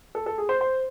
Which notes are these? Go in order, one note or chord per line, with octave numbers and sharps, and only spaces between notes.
A4
A4
G#4
C5
C5